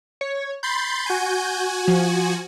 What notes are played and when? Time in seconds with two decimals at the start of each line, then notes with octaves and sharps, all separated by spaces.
0.21 C#5
0.63 B5 C6 G6 A6
1.06 F#4 G#5
1.87 F3